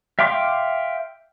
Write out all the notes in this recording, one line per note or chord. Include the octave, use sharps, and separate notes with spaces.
E5 F5 G5 C6 D6